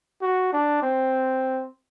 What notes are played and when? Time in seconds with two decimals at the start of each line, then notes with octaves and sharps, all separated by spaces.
0.22 F#4
0.53 D4
0.82 C4